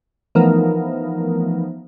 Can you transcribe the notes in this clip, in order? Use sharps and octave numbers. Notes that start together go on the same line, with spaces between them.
E3 F3 A3 B3 D#4 A#4